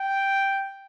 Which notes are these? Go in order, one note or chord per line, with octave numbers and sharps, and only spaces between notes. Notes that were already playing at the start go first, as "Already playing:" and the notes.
Already playing: G5